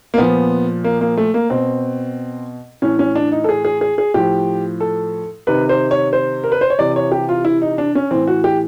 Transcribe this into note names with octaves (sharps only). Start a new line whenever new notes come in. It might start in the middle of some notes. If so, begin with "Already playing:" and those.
A#3
A#2 F3 B3
A#3
A#3
A3
A#3
B2 C4
A2 E3 C#4
C#4
D4
D#4
A4
G#4
G#4
G#4
G#4
A2 F3 G4
A4
C3 D#3 B4
C5
C#5
C5
A#4
B4
C5
C#5
C3 E3 D5
C#5
G4
F4
E4
D#4
D4
C#4
A2 E3 C4
F#4
G4